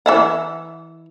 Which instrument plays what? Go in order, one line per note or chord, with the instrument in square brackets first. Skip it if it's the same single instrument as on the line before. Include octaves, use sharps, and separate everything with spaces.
[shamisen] E3 E5 F#5